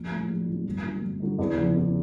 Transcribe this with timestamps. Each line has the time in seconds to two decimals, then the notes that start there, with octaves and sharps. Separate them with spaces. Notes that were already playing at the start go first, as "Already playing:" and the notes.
Already playing: A#1
0.11 A2 F#3
0.29 A#1
0.47 A2 F#3
0.66 G1
0.84 G2 D3 F#3
1.02 G1
1.20 G2 D3 F#3
1.38 E2
1.57 C#3 F3
1.76 E2